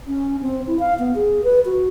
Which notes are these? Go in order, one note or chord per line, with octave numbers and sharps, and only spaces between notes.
C#4
C4
E4
F5
B3
G#4
B4
F#4